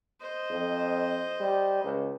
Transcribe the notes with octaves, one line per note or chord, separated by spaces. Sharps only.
C5 D#5
F2
G3
C#2